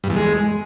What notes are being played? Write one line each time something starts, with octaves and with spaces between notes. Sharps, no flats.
G2
E2
G#3